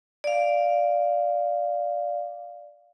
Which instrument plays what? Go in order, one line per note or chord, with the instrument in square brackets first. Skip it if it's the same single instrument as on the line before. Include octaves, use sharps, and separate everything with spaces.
[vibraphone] D5 F5